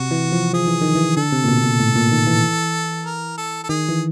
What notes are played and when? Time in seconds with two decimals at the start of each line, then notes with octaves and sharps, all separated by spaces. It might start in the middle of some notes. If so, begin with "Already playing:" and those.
Already playing: C3 F#4
0.11 E3
0.32 F3
0.53 F3 G#4
0.67 E3
0.81 D#3
0.95 E3
1.17 D3 A4
1.32 C3
1.44 A#2
1.48 B2
1.64 A#2
1.80 A2
1.96 A#2
2.12 D#3
2.27 E3
3.06 A#4
3.37 A4
3.64 A4
3.69 D#3 G#4
3.89 E3